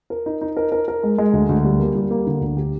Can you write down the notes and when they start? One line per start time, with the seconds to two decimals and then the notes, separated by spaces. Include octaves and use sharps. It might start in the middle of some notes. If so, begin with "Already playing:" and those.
0.10 A#4
0.26 D#4
0.41 D#4
0.57 A#4
0.72 A#4
0.88 A#4
1.03 G#3
1.18 G#3
1.33 D2
1.49 D2
1.64 G3
1.79 A#3
1.95 G3
2.11 A#3
2.27 D3
2.41 D2
2.57 G4